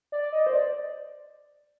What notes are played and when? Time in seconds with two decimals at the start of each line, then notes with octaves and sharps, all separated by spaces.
0.12 D5
0.33 D#5
0.47 C5
0.53 D5